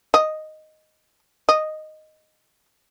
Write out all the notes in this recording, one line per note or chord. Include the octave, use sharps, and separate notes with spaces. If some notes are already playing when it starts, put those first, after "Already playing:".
D#5
D#5